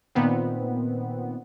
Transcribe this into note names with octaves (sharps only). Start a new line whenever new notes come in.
A#2 D#3 B3 C4